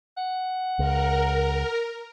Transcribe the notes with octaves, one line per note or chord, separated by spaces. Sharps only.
F#5
C#2 A#4